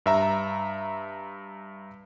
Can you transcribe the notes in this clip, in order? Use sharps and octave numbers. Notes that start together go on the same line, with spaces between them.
G2 E5 A#5